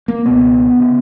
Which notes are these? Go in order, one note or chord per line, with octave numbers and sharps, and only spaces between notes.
A#3
C#2 B2 B3
C#3